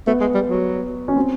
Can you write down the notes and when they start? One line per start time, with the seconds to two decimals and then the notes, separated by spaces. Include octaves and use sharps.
0.07 A3 B3
0.21 G#3
0.35 G3
0.49 F#3
1.08 C#4
1.16 C4